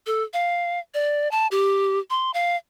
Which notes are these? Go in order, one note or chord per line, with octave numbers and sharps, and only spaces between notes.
A4
F5
D5
A5
G4
C6
F5